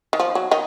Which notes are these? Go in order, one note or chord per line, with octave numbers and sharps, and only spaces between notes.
D#3
F3
F#3
D#3 D#4